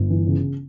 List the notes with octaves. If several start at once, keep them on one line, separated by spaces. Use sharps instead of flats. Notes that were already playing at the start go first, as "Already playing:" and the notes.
Already playing: G1
E3
C#3